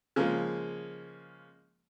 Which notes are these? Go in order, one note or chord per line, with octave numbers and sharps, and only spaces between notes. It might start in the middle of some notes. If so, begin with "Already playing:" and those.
C#3 F3 G#3 A#3